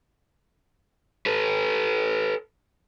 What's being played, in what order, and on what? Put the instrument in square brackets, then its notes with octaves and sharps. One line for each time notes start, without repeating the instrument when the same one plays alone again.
[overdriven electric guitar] A4 B4